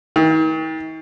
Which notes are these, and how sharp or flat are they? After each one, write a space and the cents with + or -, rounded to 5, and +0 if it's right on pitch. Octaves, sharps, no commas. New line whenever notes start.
D#3 +40